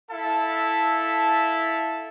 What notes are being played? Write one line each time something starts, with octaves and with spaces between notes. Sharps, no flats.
E4 A4 E5 F5 A5